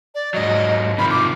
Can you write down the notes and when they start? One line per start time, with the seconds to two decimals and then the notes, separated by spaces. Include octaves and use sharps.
0.15 D5
0.34 G#2 F#3 D#5
0.98 C3 D#3 F3 B5
1.11 D6